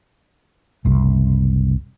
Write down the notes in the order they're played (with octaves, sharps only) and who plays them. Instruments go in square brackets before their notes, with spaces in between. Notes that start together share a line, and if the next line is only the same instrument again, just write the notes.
[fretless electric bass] F#1 C2